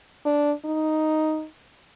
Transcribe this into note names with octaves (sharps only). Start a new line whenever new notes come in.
D4
D#4